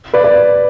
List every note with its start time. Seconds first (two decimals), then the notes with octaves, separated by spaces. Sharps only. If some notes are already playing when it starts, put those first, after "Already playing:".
0.14 B4 D5
0.24 B4 D5